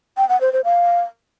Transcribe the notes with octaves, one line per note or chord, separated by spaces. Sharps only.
G5
F#5
C5
C5
F5